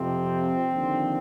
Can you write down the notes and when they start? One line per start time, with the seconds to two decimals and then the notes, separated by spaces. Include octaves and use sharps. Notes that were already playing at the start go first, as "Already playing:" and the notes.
Already playing: F2 C3 F3 C4
0.70 D#2 D3 F3